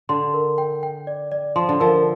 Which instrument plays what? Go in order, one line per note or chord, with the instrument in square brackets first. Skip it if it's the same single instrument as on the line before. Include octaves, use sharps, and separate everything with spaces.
[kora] D3 [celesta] C6
[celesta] A#4
G5
G5
D5
D5
[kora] F3 [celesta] C6
[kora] D3
[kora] F3 [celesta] A#4